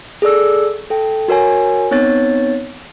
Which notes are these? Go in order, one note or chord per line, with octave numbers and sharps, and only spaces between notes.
G#4 A4 D5 E6
A4 G5
F#4 A#4 C#5 G#5
B3 C4 D#4 C#5 A6